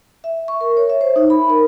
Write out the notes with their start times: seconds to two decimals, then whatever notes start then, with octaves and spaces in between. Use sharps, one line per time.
0.24 E5
0.48 C#6
0.61 A#4
0.77 C#5
0.90 E5
1.01 C5
1.16 D#4
1.30 B5
1.50 A#4